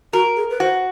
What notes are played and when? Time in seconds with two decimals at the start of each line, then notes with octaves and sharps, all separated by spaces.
0.13 F#4 A#4
0.37 G#4
0.50 B4
0.60 F#4 C5